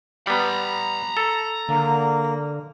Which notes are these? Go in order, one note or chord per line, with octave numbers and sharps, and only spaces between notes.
G3 B3 A#5 B5
A4
D3 A#3